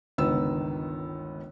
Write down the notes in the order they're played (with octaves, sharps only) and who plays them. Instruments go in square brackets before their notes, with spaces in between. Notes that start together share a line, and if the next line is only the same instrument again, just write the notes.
[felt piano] G1 C#2 D#3 B3 E6